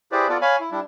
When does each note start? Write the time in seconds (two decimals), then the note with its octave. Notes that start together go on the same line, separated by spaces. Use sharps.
0.12 E4 G4 G#4 B4 C5 D5
0.29 B3 F4 A4 D5
0.41 C#5 F5 G#5 B5
0.60 E4
0.72 G3 D4 E4